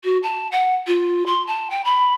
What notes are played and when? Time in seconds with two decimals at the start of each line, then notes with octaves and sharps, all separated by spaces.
0.04 F#4
0.23 A5
0.52 F#5
0.87 F4
1.26 C6
1.47 A5
1.70 G5
1.85 B5